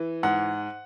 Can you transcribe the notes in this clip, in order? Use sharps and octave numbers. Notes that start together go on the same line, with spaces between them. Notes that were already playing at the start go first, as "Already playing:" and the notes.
Already playing: E3
G#2 F#5